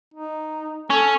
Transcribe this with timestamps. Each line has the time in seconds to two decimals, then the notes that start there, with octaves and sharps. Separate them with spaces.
0.14 D#4
0.90 C#4 A4